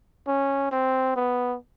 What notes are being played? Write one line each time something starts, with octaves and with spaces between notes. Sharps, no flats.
C#4
C4
B3